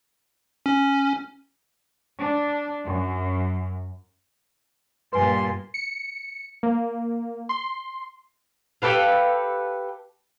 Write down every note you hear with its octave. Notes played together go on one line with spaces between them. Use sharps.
C#4
D4
F#2
G2 A#2 B4 G#5 C6
C#7
A#3
C6
G4 A4 B4 F5